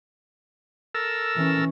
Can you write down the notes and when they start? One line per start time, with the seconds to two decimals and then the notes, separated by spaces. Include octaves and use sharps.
0.95 A4 A#4 E6
1.36 E3 C#4